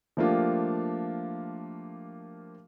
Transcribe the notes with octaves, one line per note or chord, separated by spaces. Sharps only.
F3 A3 A#3 D4 F4 G4